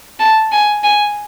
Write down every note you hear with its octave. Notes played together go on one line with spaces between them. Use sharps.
A5
G#5
G#5